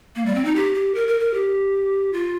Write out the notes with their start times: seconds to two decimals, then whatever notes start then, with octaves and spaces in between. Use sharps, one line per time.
0.16 A#3
0.26 G3
0.35 C4
0.45 D#4
0.56 G4
0.75 G4
0.95 A#4
1.08 A#4
1.20 A#4
1.34 G4
2.13 F4